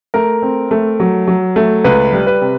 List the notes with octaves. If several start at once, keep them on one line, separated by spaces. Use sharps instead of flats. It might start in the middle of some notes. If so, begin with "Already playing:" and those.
A3 A#4
C4
A3
F#3
F#3
A3
C#2 B4
G3
B4
C3